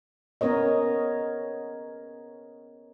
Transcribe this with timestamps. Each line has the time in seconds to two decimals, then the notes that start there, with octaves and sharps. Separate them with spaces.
0.41 B3 C#4 A#4 C#5 D#5